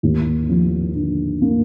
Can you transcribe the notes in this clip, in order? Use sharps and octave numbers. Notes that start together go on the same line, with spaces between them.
D#2
F3
D3
A#3